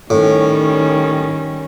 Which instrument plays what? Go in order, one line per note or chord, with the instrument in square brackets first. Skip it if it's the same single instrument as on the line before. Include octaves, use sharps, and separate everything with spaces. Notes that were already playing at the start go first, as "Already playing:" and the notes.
[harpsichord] A2 [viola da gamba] D#3 G3 C#4